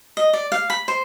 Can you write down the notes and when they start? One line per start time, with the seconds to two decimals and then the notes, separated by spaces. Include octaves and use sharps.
0.17 D#5
0.33 D5
0.52 F5
0.70 B5
0.88 C5